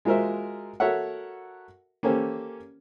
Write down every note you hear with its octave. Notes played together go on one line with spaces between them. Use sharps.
G#3 F4 F#4 A#4 C5 E5
F#4 A4 A#4 C#5 E5 F#5
A#3 C#4 G4 A4 C5